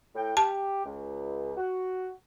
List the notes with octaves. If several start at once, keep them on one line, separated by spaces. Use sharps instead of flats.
A2 G5
G4 A5
C#2
F#4